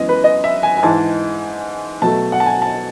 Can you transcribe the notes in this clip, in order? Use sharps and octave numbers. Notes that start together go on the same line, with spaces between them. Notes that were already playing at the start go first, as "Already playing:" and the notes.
Already playing: F#2 E3 G#3 B3 D#5
B4
D#5
E5
G#5
G#5
G#2 E3 G#3 A5
B2 F#3 A3 A5
F#5
A5
G#5
A5